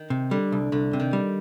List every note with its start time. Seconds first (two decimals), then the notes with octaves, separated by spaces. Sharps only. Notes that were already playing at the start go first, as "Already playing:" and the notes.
Already playing: D#3
0.10 C3
0.31 D3 G3
0.52 C2
0.72 C2 D3
0.93 C3
1.00 D#3
1.13 G3